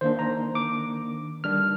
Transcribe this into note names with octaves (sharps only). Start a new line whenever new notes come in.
D#3 A#3 D4 C5
A#5
D6
D#3 G3 D4 F6